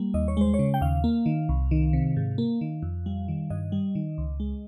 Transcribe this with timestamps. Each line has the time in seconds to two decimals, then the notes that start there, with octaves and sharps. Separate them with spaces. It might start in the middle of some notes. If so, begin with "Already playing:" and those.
Already playing: G3 A#3
0.14 D#2 D#5
0.28 C#5
0.37 G#3 C5
0.54 C#5
0.59 C#3
0.74 G5
0.81 D#2 F5
1.04 A#3
1.26 D#3
1.49 C2
1.71 D#3
1.93 C3
2.16 G#2
2.38 A#3
2.61 D#3
2.83 F2
3.06 G3
3.28 D#3
3.50 G2 D#5
3.72 G3
3.95 D#3
4.18 C#2
4.40 G#3